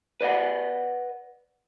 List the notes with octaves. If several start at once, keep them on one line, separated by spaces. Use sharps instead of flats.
B4 D5 D#5 F#5